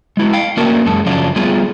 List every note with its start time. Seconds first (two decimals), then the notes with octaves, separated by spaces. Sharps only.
0.17 G#3 E4 F#4
0.33 F5 G5
0.57 A3 A#3 C#4 D4 F#4 A#4
0.86 F#2 G#3 A4
1.06 F#2 C#3 F3 F#3 D4 F4
1.36 G3 A3 B3 F4 G#4